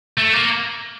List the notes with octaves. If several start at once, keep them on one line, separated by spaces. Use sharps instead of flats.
A3
A#3